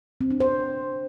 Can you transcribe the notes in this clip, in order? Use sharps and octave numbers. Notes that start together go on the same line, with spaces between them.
C4
D4
C5